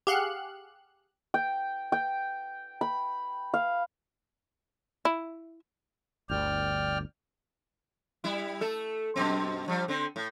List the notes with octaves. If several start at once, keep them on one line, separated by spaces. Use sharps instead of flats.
G4 G#4 F5 F#5 F#6
G5
G5
B5
F5
E4
G1 D2 D5 G5 F6
G3 E4
A3 A4
F#2 B2 C4
F3 G3
D3 C4
A2